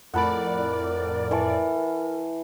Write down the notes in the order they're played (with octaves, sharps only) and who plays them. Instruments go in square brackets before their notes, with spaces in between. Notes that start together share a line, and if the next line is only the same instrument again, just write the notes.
[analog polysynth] F2 A2 D5 [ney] A#4 [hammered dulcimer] F#5 A5 B5
[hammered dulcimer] E3 A5 C#6